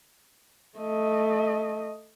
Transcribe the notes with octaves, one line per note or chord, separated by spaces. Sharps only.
A3 D#5